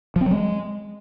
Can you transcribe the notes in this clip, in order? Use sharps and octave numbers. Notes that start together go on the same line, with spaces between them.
F3
C4
F#3
G#3